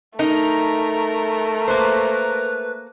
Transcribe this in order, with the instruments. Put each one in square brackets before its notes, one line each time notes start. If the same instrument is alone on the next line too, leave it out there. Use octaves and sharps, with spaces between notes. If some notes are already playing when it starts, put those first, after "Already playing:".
[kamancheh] A3 [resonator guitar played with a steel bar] D#4 [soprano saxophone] A#4
[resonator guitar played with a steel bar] A#3 C5 [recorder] B4